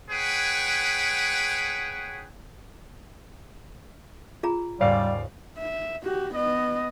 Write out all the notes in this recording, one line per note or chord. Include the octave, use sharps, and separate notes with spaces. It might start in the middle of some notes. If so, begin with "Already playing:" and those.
G#4 B4 C#5 F#5 G5
F4 G#4 A#5
D#2 G#2 C#3 G3 D5 F5
E5
F#4 G4
B3 D#5